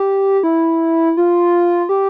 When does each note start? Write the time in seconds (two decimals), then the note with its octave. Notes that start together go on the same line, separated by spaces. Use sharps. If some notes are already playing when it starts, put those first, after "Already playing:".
Already playing: G4
0.43 E4
1.17 F4
1.89 G4